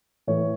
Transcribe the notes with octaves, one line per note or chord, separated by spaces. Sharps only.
A2 E3 C#5